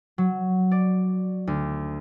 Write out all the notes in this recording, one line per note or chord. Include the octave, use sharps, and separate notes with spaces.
F#3
D5
D2